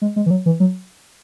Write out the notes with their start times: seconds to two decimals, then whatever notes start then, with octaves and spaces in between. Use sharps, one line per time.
0.02 G#3
0.16 G#3
0.26 E3
0.31 F#3
0.46 E3
0.60 F#3